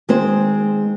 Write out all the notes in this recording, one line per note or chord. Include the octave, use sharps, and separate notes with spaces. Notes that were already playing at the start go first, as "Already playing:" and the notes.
D#3 G#3 C4 D#4 G#4 C5